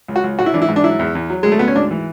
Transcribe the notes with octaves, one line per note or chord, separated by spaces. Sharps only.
C#2
F#4
C#2
G#2 F#4
E4
E3 D4
E4
G#2
D4
F#3 E4
E2
E2
F#3
D2 G#3
A3
D2 B3
C#4
G#2 D4
E3